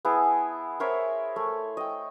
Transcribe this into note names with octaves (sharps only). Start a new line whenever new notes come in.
B3 E4 G#4 A5
A#4 C5 C#5 E5
A3
D#5 G5